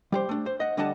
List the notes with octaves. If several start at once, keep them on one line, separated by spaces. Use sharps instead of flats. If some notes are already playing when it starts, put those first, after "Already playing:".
G3 G4 C5
A3 D4
C5
D#5 F#5
D3 G3 D4 D#5 F#5 A5